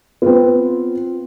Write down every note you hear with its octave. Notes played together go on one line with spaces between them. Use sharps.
B3 C4 F4 B4